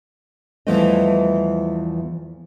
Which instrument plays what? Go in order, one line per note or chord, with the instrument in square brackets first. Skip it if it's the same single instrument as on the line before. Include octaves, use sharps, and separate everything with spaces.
[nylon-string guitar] E2 E3 F3 G3 A3 D#5